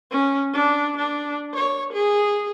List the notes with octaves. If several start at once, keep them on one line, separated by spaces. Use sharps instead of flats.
C#4
D4
D4
C#5
G#4